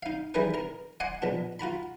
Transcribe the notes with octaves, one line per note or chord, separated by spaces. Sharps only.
D#4 F5
E3 G3 D#4 G#4 A#4 B4
A#4 A#5
D#5 F#5 G#5 C6 D6
A#1 B2 D4
F4 F#4 A#5 B5